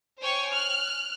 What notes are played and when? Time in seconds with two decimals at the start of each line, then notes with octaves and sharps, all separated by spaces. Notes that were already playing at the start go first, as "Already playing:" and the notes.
0.20 C5 C#5 G5 G#5 C#6
0.51 F6 F#6